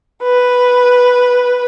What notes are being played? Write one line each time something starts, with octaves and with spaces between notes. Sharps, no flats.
B4